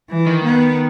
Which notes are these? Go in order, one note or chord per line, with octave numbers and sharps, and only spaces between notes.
E3
D#3
B3